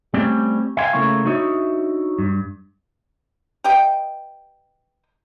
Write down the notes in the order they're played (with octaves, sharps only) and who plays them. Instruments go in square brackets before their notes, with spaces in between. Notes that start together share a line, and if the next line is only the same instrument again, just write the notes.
[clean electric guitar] G3 A3 C4 C#4 G4 D5
E5 F5 G5 G#5 C6
C#3 A3 A#3 E4 C#5
D4 D#4 F#4 C#5 D#5 E5
G2
[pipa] G4 B4 D#5 G5